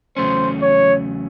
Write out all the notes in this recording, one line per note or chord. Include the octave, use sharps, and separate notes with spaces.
E2 C#3 F#3 A3 C#4 C5
C#5